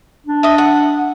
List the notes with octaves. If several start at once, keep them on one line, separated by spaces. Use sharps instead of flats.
D4
D#5 E5
F#5